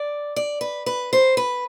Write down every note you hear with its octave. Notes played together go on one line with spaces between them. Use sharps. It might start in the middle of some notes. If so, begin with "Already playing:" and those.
Already playing: D5
D5
B4
B4
C5
B4